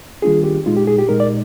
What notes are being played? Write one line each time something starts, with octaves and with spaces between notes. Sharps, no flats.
D#3 G3 A#3 D4 F4 G#4
G4
A#2 G#3 D#4 F4
G4
G#4
G4
A#2 G#3 D#4 A#4
D5